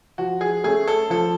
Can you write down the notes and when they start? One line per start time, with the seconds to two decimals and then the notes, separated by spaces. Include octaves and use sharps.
0.18 F3 F#4
0.41 G#4
0.64 A3 C#4 G#4
0.87 A4
1.10 F3 A4